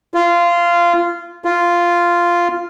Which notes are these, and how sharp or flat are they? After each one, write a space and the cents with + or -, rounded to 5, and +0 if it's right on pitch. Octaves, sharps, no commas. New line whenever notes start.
F4 -15
F4 -5